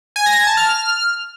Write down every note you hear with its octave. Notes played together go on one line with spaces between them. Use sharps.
G#5
A#6
G#6
A5
F6